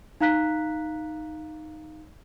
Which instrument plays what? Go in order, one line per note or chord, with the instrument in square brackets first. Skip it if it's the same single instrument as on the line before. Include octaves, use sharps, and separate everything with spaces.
[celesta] D#4 F5 A#5 F#6 B6